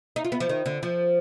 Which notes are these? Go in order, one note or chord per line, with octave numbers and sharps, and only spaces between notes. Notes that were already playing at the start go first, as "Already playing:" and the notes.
D#4
F4
B3
F3
D#3
D3
F3